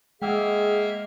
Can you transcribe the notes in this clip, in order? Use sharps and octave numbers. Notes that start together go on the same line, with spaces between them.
G#3 A#3 G#4 E5 F#5 G5 E6 F6